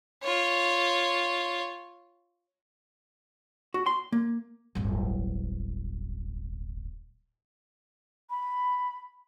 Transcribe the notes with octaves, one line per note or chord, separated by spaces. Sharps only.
F4 C#5
F#4
C6
A#3
D1 G1
B5